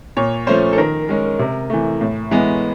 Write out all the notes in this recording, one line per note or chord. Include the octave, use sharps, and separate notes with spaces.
A#2 C#5
F3 A3 C#4 C5
A4
D#3 A#4
G#3 C#4
C3
E3 A3
A2
E3 G#3 B3